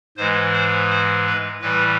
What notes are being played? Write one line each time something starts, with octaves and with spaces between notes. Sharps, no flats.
G#2 E3 G#3 C5
C5
C5
B4
A2 E3 G3 B4